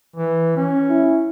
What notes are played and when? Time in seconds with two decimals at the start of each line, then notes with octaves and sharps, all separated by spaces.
0.16 E3
0.57 C#4
0.89 E4